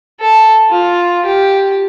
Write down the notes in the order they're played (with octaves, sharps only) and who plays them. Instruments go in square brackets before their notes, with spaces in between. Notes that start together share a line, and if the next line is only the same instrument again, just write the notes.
[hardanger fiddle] A4
F4
G4